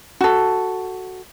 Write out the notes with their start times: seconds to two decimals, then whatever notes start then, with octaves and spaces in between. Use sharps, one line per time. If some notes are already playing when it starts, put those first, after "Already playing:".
0.21 F#4 A4